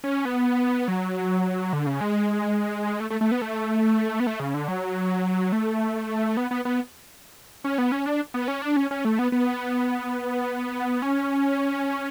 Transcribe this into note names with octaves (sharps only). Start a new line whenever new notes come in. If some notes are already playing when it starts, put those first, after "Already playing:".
C#4
B3
F#3
D3
C#3
G#3
A3
A3
A3
B3
A3
B3
A3
C#3
D3
F#3
A3
B3
B3
B3
C#4
B3
C#4
D4
B3
C#4
D4
C#4
C#4
A3
B3
B3
C#4